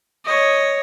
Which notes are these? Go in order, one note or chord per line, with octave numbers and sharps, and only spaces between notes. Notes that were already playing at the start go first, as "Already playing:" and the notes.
C#5 D#5